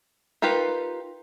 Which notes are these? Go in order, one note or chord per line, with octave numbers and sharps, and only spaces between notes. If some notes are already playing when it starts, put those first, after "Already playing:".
D#4 F4 G4 A#4 B4